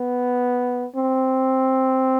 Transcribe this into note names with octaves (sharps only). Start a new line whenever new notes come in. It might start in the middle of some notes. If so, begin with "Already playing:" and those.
Already playing: B3
C4